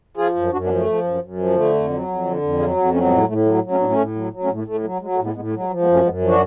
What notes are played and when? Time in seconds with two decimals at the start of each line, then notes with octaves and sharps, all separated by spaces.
0.17 F3 F4 G#4
0.36 F#2
0.52 F#2 D4 F#4
0.64 B3 D4
0.69 F3
0.75 A3
0.86 F3
1.04 F#2
1.22 F#2
1.38 F3
1.55 D3 A3
1.74 F2
1.90 F#3
2.08 F2
2.25 D3
2.42 F2
2.59 F#3 F4 G#4
2.76 F2
2.93 F#3 A3 C#4
3.05 G#3 B3
3.11 A2
3.17 G#3
3.28 A2 A3
3.46 F#3 A3
3.64 F#3
3.71 A3 C#4
3.80 A2 B3 D4
3.90 A3 C#4
3.98 A2
4.15 F#3
4.32 F#3
4.44 A3 C#4
4.49 A2
4.55 A3
4.66 A2 A3
4.84 F#3
5.01 F#3 G#3
5.13 A3
5.19 A2
5.24 G#3 B3
5.35 A2 G#3 B3
5.47 A3
5.53 F#3
5.59 G#3
5.70 F3
5.81 G#3 B3
5.87 F#2
5.93 A3 C#4
6.05 F#2 G#3 B3
6.21 F3
6.27 D4 F#4